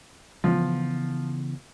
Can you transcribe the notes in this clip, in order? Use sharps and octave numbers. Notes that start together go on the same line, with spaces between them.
C#3 E3 F3 B3